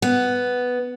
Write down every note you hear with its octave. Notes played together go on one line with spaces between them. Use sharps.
B3